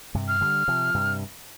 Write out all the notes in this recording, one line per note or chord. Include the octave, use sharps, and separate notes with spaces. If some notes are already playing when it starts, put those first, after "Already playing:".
G2 C3
F6
D3 G3
C3 F3
G2 C3